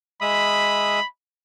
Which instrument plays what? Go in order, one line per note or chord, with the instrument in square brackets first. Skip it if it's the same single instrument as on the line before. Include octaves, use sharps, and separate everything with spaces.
[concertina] G#3 E5 D#6 [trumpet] B5